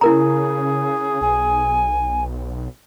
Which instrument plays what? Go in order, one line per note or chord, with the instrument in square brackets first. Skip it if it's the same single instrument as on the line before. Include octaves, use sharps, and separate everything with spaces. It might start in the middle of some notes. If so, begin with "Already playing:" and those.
[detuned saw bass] C#3 [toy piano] E4 A#4 A#5 [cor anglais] G#4
[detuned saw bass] B1 [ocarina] G#5